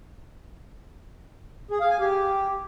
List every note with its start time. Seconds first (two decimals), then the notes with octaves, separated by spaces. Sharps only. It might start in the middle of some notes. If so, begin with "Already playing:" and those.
1.71 G#4
1.80 F5
1.90 G#5
2.00 G4